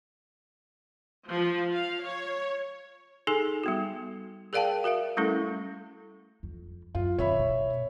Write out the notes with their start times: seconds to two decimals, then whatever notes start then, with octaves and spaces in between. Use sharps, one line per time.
1.30 F3
1.73 F5
2.04 C#5
3.27 D#4 G#4 A4 G#5
3.64 G3 B3 F#4
4.53 G#4 A#4 D5 F5 G5 A5
4.84 F#4 A#4 E5 F5
5.17 G3 A3 C#4 E4 A4
6.43 F2
6.95 F#2 F4
7.18 B2 D#3 C#5 E5 B5
7.39 B2